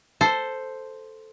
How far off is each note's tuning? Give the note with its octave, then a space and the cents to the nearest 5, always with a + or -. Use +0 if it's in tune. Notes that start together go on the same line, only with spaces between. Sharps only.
A4 +0 C5 +0